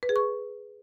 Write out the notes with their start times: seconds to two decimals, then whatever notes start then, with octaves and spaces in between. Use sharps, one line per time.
0.03 B4
0.09 G#4
0.16 C#6